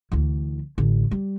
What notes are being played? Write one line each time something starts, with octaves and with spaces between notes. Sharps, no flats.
D2 E3
A1 D3
G3